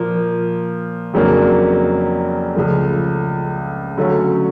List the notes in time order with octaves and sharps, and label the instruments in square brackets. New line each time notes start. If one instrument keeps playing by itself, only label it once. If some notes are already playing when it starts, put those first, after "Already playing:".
Already playing: [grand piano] A#2 F3 A#3
F2 C#3 F#3 A#3 D4
C#2 C#3 F3 A3
D3 F#3 A3 C#4